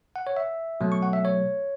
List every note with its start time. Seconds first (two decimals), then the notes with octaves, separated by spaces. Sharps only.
0.16 F#5
0.27 C#5
0.37 E5
0.81 B2 F#3 A3
0.92 C#6
1.03 F#5
1.13 E5
1.25 C#5